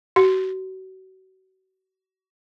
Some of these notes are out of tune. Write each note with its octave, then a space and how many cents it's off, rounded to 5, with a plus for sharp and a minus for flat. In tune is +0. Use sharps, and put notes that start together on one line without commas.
F#4 +35